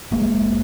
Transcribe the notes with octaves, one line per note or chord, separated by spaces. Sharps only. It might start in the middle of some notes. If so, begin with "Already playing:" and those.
F#1 G#3 A#3